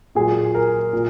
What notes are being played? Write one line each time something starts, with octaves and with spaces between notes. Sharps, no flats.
A#2 F#3 G#4
A#4
A#2